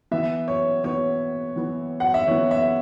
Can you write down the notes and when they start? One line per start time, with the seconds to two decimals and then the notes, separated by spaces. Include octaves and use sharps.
0.11 E3 B3 E5
0.48 C#5
0.83 E3 B3 C#5
1.56 E3 B3
2.00 F#5
2.14 E5
2.27 E3 B3 C#5
2.51 E5